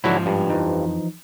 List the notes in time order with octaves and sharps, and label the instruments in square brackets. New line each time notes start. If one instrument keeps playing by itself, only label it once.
[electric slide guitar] G#2 F3 [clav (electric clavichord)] D3 F#3 E4
[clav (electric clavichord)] G2
[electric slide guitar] F2 [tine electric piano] E3 F3 D#4